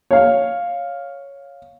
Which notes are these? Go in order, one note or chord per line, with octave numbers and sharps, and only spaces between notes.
C#5 F5